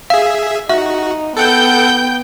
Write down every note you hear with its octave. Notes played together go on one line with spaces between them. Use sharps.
G#4 E5 F5
D#4 F#4 E5
B3 A4 F#5 G5 G6